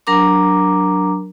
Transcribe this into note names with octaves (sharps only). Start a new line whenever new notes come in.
F#3 D4 A#4 A#5 D6